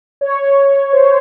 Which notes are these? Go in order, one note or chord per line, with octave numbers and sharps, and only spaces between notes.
C#5
C5